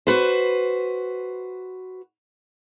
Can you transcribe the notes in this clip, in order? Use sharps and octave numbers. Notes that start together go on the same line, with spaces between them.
F#4 B4 C5